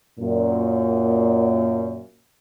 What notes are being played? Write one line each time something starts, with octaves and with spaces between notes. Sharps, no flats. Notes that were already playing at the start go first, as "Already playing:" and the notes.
F#2 A#2